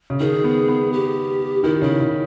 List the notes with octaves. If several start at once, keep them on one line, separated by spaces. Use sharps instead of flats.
C#3
D#3 G#4
B3
B3
G4
D#3 E4
C#3 E4
C#3